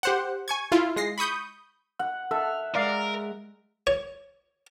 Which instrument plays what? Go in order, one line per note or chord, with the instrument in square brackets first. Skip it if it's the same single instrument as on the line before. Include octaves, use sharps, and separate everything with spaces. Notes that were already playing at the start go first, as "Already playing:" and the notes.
[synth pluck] G4 C5 F#5
G#5 C#6 G#6
E4 F4
G#3 A#6 C7
B5 C#6 D#6 G6
[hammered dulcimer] F#5
[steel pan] A4 [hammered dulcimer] E5 [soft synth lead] F6
[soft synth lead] G#3 [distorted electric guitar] A#4 [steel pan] D5 F5
[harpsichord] C#5